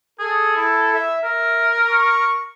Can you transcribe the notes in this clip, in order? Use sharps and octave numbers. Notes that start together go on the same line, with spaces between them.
G#4 A4
E4
E5
A#4 E5
C#6